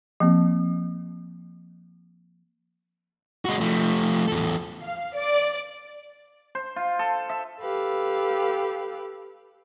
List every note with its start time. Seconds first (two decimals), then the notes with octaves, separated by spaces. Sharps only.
0.20 F3 A#3 C4
3.45 G#3 F#4
3.61 F3 A3
4.28 E2 A4
4.82 F5
5.15 D5
6.55 C5
6.76 F4
6.99 A4
7.29 E5
7.61 G4 A4 B4 F5